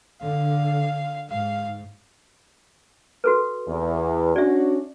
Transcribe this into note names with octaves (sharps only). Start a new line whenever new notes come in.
D3 F5
G#2 F5
F#4 A4 B4
E2
C#4 D4 F#4 D5 E5